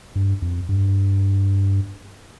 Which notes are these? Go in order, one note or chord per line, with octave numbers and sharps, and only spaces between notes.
G2
F2
G2